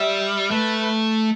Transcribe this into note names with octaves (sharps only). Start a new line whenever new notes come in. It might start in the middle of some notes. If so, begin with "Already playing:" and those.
Already playing: G3 E5
A3 B4